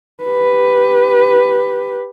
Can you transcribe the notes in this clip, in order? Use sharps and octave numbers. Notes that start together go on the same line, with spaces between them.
G4 B4